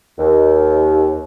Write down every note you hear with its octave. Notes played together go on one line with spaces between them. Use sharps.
D#2